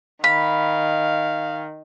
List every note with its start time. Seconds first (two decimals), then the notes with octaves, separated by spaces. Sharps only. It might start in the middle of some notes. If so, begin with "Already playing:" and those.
0.24 D#3 F5 B5